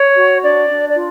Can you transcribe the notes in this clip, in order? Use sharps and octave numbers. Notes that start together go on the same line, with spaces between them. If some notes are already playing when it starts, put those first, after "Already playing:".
Already playing: C#5
F#4
D4 D5
D4
D5
F4